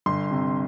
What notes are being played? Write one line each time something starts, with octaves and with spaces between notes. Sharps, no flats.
G1 C6
C3